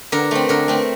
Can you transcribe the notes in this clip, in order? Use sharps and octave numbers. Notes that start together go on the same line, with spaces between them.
D3 A#4
A3 C4
D3 A#4
A3 C4